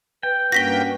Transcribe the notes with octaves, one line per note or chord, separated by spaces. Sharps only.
B4 G5
G2 A#3 C#4 F#4 G5 A#6 B6 G7